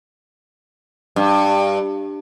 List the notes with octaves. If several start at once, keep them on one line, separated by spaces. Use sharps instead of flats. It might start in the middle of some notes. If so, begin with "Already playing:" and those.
G2